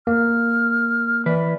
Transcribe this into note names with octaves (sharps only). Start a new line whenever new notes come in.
A#3 F6
E3 B4 D5